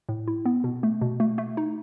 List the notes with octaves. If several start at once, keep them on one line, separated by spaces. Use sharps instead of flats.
A2
E4
B3
B2
A3
B2
A3
A3
D#4